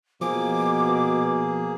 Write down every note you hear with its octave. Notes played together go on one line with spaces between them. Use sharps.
B2 F3 A#3 G#4 D6